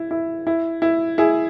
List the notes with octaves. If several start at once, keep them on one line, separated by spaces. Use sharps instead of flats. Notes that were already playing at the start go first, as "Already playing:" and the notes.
Already playing: E4
E4
E4
E4
E4 G#4